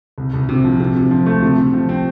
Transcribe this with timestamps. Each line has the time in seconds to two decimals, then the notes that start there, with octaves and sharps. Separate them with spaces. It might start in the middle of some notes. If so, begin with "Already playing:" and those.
0.18 C2
0.34 C2
0.49 C3
0.64 F3
0.80 C3
0.95 C3
1.11 F3
1.26 A3
1.42 C3
1.58 C3
1.74 F3
1.89 C4